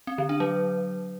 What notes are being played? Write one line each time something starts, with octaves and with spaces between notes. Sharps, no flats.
C4
D3
D4
F#3